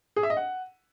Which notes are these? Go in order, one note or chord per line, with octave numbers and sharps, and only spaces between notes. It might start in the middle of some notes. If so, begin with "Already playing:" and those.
G#4
E5
D#5
F#5